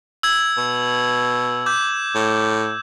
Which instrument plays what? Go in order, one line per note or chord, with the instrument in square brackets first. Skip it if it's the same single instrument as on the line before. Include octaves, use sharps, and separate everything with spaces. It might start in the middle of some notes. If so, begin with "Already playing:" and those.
[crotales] E6 G#6
[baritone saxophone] B2
[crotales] D6 G6
[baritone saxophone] A2